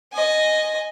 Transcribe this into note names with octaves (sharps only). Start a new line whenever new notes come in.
D#5 G#5